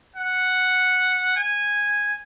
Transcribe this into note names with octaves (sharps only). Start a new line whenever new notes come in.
F#5
G#5